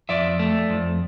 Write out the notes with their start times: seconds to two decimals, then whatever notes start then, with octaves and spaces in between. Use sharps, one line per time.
0.09 F2 D5 E5
0.39 A3
0.69 F2